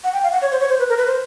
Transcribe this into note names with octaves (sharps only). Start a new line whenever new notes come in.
F#5
G5
F5
F#5
C#5
C5
C#5
C5
B4
A#4
B4
C5